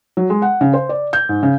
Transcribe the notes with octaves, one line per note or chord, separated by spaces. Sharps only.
F#3
G#3
F#5
C#3
C5
D5
G6
G#2
C#3